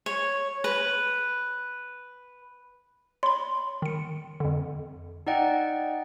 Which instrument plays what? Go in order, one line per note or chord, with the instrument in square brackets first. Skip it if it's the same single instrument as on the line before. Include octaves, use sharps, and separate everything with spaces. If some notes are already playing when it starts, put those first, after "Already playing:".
[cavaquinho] C#5
B4
[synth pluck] C#5 B5 [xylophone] C6
[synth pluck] D#3 C#7
F2 D3
[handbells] D#4 D5 D#5 F#5 G5